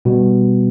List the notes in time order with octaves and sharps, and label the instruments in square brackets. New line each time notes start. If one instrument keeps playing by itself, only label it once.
[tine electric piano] B2 G3 B3